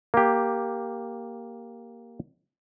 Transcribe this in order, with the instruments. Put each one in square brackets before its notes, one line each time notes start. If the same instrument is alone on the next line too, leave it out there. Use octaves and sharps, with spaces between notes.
[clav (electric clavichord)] A#3 G4